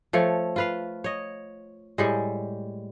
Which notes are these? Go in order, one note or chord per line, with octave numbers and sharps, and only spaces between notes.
F3 A3 C#5
F4 B4 F5
C#5 D#5
A2 G3 G#3